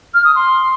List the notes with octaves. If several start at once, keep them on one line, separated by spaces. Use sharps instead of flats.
F6
D#6
C6